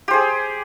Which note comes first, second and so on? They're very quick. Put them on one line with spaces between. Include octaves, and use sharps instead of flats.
G4 C5 G#4